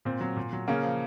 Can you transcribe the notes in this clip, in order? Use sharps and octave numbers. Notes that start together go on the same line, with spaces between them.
A#2 C4
F#3
A#2
F#3
C#3 A#3 C#4
F3